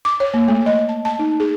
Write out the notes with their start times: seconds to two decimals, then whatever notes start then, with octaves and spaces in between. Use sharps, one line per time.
0.05 D6
0.20 C#5
0.34 A#3
0.48 A3
0.66 D#5
0.89 A5
1.05 A5
1.19 D#4
1.40 G#4